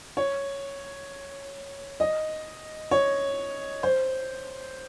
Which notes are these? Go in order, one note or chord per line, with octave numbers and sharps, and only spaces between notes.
C#5
D#5
C#5
C5